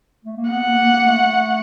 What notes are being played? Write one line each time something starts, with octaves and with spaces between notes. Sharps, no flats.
A3
A#3
B3 F#5
A#3
A#3
A#3
A3